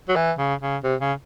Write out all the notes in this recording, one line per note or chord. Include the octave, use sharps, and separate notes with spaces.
F#3
E3
C#3
C#3
C3
C#3